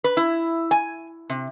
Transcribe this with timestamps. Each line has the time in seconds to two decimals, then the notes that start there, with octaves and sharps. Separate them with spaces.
0.04 B4
0.17 E4
0.71 G#5
1.30 C3